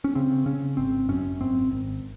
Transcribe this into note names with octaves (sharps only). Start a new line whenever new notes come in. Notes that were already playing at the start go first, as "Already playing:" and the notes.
C#4
C#3 C4
C#3 C#4
G#1 C4
F#2 C#4
G#1 C4
G#1